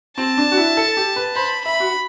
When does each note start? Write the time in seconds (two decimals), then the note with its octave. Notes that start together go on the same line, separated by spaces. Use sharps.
0.18 C4 A5
0.38 D4
0.52 F#4
0.57 E4
0.77 A4
0.97 G4
1.16 B4
1.36 C5 B5
1.66 E5 B5
1.80 F#4